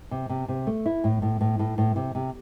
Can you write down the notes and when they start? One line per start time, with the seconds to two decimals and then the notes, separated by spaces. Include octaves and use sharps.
0.11 C3
0.29 C3
0.48 C3
0.67 A3
0.86 E4
1.04 A2
1.22 A2
1.41 A2
1.59 A2
1.78 A2
1.96 C3
2.15 C3